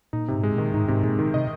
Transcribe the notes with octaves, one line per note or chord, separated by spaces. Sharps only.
A#2 D#4
G#2 C3
G#3
A#2 D#3
G#2 D#4
G#2 C3
A#2 G#3
D#3
C3 D#5